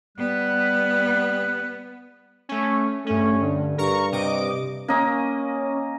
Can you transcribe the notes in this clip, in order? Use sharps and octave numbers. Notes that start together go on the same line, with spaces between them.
G3 B3 F#6
A3 C#4
G2 A3 C#4
G2 D3
G2 A#4 A#5 C#6
C3 D#5 D6
A#3 C#4 D#5